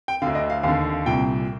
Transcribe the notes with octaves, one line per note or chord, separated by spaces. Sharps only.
G5
D2 D3 F5
D#5
F5
D#2 D3 F5
C2 A#2 G5